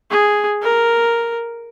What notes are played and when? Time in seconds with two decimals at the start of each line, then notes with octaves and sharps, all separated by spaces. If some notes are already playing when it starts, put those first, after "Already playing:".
0.11 G#4
0.63 A#4